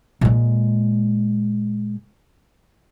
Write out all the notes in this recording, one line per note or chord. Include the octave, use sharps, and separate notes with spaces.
A#2 G#3